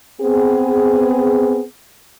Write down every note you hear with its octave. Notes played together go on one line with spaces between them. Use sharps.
B3 C4 G#4